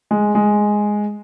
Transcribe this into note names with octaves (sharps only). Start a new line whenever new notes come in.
G#3
G#3